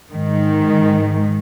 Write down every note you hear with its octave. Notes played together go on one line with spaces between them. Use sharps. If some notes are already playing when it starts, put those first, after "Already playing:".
G#2 D#3